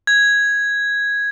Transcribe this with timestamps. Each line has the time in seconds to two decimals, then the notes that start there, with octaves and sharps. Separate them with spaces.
0.07 G#6